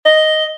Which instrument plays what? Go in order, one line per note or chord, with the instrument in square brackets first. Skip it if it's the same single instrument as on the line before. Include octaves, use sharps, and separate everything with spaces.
[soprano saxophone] D#5